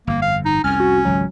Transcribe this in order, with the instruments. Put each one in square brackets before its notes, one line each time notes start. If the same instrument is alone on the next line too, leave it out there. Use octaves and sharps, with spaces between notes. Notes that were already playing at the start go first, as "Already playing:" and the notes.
[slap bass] G1 F2 [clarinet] A#3
[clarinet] F5
D#4
[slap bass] C2 F2 [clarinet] C#4 [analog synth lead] F6
[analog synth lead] F#4
[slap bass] G#1 C#2 [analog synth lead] F#3